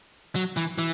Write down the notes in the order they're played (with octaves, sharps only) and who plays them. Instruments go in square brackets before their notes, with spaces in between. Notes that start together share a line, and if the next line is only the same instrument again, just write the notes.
[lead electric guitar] F#3
E3
E3